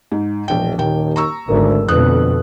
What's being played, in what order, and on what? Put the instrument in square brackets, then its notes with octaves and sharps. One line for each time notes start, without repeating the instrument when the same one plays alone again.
[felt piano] G#2
[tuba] E1 [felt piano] A#1 G5
[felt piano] D#1 G5 [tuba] D#2
[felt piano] A#5 C#6 E6
[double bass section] G#1 [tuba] D2 [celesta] A#4
[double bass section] F2 B2 A3 [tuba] D3 [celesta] B4 D#6 [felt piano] F#6